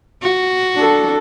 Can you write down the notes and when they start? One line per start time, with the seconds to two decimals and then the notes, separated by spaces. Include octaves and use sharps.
0.23 F#4
0.75 D4 A4